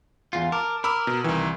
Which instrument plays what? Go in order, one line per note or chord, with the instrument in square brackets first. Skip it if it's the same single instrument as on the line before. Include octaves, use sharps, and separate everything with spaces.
[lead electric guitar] E2 F4
[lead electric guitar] A#4 [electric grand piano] A5 D6
[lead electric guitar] A#4 [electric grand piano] B5 D6 E6
[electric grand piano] B2
[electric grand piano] C2 E3 [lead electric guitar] D#3